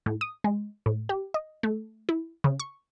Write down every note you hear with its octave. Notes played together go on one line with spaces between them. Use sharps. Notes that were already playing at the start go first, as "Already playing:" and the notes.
A2
D#6
G#3
A2
G4
D#5
A3
E4
C#3
C#6